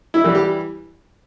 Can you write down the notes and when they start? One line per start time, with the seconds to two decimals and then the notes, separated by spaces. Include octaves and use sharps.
0.14 E4
0.24 E3 G3
0.35 G4